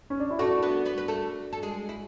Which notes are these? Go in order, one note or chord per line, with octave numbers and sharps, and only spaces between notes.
C#4
D4
E4
A3 D4 F#4 A4
B3 B4
B3 B4
B4
A3 A4
A4
G#3 G#4
E4